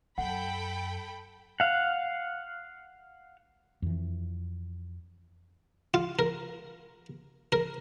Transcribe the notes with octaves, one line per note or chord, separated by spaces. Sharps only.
F#2 A4 F#5 G5 B5
F5 F#5
F2 E3
F4
A#4
A#4